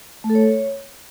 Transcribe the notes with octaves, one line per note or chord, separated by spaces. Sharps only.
A3
A4
C#5